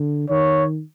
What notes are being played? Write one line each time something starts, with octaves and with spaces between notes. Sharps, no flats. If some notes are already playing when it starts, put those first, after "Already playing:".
Already playing: D3
D#3 C#5